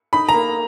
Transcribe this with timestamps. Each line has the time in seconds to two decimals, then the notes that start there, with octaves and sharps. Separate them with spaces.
0.13 D#4 B5
0.29 A#5
0.34 A#3